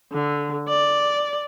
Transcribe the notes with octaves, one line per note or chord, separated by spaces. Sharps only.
D3
D5